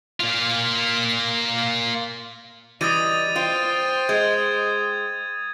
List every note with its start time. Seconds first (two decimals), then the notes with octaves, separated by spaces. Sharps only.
0.20 A#3 F4
2.81 E3 G3 D#5 D#6 A6 D#7
3.36 F4 C5 G5
4.09 G#3 G#6